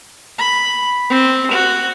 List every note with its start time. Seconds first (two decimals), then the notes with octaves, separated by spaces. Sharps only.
0.38 B5
1.10 C4
1.51 F#4